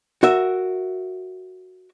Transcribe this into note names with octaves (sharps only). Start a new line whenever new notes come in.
F#4 A#4 E5